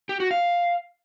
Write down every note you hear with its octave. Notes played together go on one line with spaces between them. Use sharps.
G4
F#4
F5